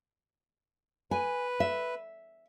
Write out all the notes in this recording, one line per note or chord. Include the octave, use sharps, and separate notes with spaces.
B4 G#5
E5